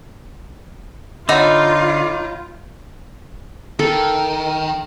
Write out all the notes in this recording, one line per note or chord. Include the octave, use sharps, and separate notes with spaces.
D3 D#4 F4 C#5 F#5 B5
D#3 A4